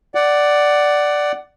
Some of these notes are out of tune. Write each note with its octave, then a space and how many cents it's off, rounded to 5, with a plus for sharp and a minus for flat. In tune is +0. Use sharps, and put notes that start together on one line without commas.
D5 +0 F#5 +15